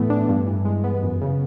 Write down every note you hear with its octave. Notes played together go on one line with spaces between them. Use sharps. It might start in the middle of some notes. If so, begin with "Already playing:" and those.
Already playing: A2 E3 A3 B3
D4
G2
E3
G#3
B3
F#2
C#3